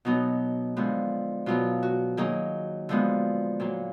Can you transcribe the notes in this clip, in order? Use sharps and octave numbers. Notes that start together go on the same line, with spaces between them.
B2 F#3 B3 D#4
D3 F3 G#3 B3
B2 F#3 B3 F4
F#4
D#3 F#3 A#3 G#4
D3 F3 G#3 B3
A#2 F#3 A#3